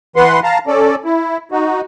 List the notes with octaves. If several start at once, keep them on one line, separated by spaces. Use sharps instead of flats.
E3 B4 F#5 C6
F5 A5 A#5
C#4 A4 D5
E4
D#4 F#4